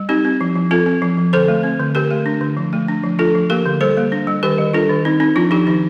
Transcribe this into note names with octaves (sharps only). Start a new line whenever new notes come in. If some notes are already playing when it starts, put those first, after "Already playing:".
Already playing: G3
C4 D#4 G4
C4
F3
F3
C4 F4 A4
C4
F3
F3
D3 A4 C5
A3
C4
D3
D3 G4 A#4
A3
D4
D3
F3
A3
D4
F3
D4 F4 A4
F3
A#3 G4 A#4
D3
G3 A4 C5
A#3
D4
G3
D#3 G4 A#4
G3
D4 F4 A4
D#3
C4 D#4
C4 D#4
F3 D4 F4
F3 D#4 G4
D#3 D#4